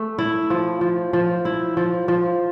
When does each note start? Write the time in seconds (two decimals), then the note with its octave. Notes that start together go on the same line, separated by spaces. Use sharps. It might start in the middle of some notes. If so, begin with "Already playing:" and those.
Already playing: A3
0.19 E4
0.50 F3
0.81 F3
1.13 F3
1.45 E4
1.77 F3
2.08 F3